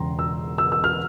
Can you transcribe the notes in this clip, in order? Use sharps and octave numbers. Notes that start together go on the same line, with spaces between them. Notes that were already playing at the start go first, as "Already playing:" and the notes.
Already playing: E1 E2 C#3 G5 A#5 C6
E6
E6
E6
F6